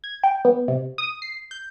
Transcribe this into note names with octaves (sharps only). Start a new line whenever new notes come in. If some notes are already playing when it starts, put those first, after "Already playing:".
G#6
G5
B3
C3
D#6
C7
G6